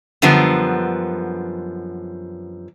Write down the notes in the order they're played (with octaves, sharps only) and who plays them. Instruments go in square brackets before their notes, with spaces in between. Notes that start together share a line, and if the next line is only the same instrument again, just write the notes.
[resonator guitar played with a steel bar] F#2 D3 F3 G3 B3